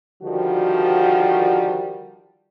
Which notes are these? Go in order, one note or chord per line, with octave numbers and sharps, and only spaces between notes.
D3 D#3 F3 G3 F#4